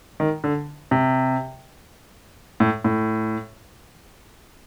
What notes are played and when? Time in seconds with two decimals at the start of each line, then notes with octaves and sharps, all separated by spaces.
0.20 D#3
0.44 D3
0.91 C3
2.60 A2
2.84 A2